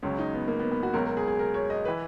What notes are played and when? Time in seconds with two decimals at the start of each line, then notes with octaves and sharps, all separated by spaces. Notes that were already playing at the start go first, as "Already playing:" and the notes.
0.02 C#2 C#3 F#3 C#4
0.19 D#4
0.34 B3
0.48 A#3
0.59 B3
0.71 B3
0.83 F#4
0.93 C#2 B2 F#3 A#4
1.05 A#4
1.17 G#4
1.28 G#4
1.39 A#4
1.54 C#5
1.70 D#5
1.85 E3 B4